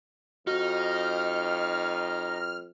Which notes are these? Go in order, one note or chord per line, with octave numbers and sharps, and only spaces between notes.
F2 D#4 F#4 F6